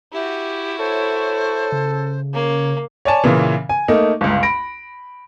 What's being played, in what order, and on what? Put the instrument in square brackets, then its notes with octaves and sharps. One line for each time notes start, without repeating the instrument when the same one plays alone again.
[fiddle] E4 F#4 [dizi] G4
[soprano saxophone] A4 [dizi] C5 [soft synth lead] C#5
[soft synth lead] C#3
[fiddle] A#3 [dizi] C#5
[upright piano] C#5 D5 G#5 A5
A#2 C#3 E3
G#5
A3 A#3 D#4
G1 C#2
B5 A#6 D7